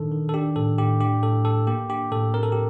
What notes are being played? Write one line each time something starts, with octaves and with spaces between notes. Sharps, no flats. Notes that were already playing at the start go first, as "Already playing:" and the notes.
Already playing: A#2 D#3 D4 A4
D#3
A4
D4 G4
A2 A4
A2 G4
D4 G4
A2 A4
A2 A4
A#3 G4
D4 G4
A2 A4
C4 A#4
A4
G4